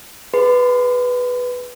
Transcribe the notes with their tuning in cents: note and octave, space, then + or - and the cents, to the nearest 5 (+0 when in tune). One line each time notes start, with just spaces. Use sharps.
G#4 +0 B4 +0 C6 -45